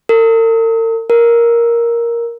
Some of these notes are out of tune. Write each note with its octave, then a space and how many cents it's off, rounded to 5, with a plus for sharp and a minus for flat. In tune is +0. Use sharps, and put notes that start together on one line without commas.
A#4 -45
A#4 +5